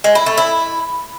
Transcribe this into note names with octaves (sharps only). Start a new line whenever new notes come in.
G#3
E4
A3
E4